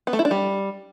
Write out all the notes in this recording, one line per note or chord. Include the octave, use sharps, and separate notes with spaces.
B3
A3
E4
D4
G3